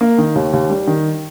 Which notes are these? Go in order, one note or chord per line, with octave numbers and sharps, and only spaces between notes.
A#3
D#3
D#2
D#2
G3
D#3